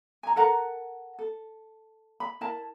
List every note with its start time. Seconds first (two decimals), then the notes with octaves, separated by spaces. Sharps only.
0.23 G#5 A#5
0.36 A4 A#4 F#5 A#5
1.19 A4
2.20 B5
2.41 E4 A#4 A5